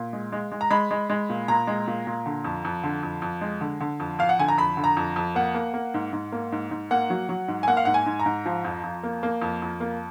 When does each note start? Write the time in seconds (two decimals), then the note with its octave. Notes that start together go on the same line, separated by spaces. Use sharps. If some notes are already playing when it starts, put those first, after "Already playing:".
Already playing: A#2
0.13 G#3
0.32 G#3
0.52 G#3
0.61 A#5
0.71 G#3 B5
0.91 G#3
1.10 G#3
1.29 A#2
1.48 A#2 A#5
1.67 G#3
1.87 A#2
2.07 A#2
2.26 D3
2.44 F2
2.65 F2
2.83 D3
3.03 F2
3.22 F2
3.41 G#3
3.61 D3
3.81 D3
4.00 F2
4.19 F2 F5
4.29 F#5
4.39 D3 G#5
4.48 A#5
4.58 F2 B5
4.77 D3
4.84 A#5
4.97 F2
5.16 F2
5.35 A#3 F#5
5.54 A#3
5.74 A#3
5.94 G#2
6.13 G#2
6.32 A#3
6.52 G#2
6.71 G#2
6.91 A#3 F#5
7.10 F#3
7.29 F#3
7.48 G#2
7.63 G#5
7.67 A#3 F#5
7.77 F5
7.85 G#2 F#5
7.94 G#5
8.06 G#2
8.20 A#5
8.26 G#2
8.45 F3
8.64 F2
8.83 F2
9.03 A#3
9.23 A#3
9.41 F2
9.62 F2
9.80 A#3